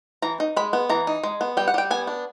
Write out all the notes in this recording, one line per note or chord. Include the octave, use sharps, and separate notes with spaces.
E3 A#5
D#4
G#3 B5
B3
E3 A#5
D#4
G#3
B3
G3 G5
F#5
G3 G5
B3 G#5
D4